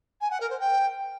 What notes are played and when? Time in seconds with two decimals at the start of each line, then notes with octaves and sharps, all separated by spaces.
0.21 G#5
0.31 F#5
0.40 A#4
0.50 C5
0.60 G5